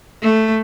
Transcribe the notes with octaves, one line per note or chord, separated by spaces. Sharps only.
A3